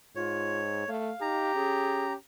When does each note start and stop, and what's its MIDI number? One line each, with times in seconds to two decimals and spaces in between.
0.16 0.83 44
0.16 0.62 65
0.16 0.90 73
0.88 1.11 57
0.88 1.54 77
1.21 1.52 63
1.21 2.15 67
1.21 2.13 82
1.55 2.15 61
1.55 2.05 68